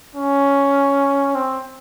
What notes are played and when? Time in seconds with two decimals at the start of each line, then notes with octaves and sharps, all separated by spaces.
0.16 C#4
1.35 C4